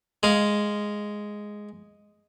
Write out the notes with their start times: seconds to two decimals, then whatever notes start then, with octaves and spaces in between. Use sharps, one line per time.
0.23 G#3 F5